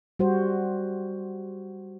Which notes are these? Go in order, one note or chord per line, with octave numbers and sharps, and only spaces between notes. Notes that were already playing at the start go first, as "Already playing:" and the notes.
G3 F#4 C5